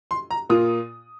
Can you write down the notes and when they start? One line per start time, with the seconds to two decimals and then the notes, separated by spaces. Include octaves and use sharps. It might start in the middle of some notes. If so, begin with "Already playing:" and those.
0.11 C6
0.31 A#5
0.49 A#2 A#3 F4 D#6